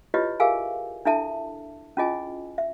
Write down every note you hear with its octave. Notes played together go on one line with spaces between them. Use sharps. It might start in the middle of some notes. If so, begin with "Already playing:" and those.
E4 F4 G4 B4 C#5 D#5
G4 G#4 A#4 E5 F5 G#5
D4 E4 A4 E5 A5
C#4 E4 F4 G#4 D#5 G#5
E5